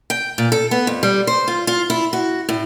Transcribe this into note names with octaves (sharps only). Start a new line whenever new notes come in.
G5
A#2
A4
B3
F2
G3
C5
F4
F4
E4
F#4
A2